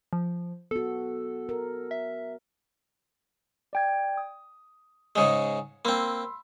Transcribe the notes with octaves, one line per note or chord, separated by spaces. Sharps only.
F3
B3 F#4 A4
A#4
E5
D5 G5 G#6
D#6
G#2 C#3 G#3
A#3 C4 B5 C6 E6